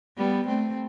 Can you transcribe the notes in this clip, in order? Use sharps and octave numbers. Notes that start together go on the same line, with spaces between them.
G3 B3
A3 C4